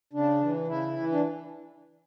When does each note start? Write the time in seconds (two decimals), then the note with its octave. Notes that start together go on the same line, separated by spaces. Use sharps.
0.13 C#3 D4
0.40 E3
0.67 C#3 E4
0.94 E3
1.12 D4